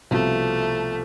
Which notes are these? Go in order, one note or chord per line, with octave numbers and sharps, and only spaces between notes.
C2 B2 F3 A3